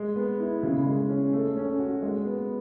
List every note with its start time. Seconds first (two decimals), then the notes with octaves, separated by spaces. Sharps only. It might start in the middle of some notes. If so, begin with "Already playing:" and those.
Already playing: G#3
0.16 B3
0.39 E4
0.63 C#3
0.86 G#3
1.09 C#4
1.33 A3
1.57 C#4
1.79 F#4
2.03 G#3
2.26 B3